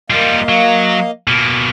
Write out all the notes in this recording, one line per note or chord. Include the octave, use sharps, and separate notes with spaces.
G3 A#3 F4 D#5 F5
F#3
B2 A#3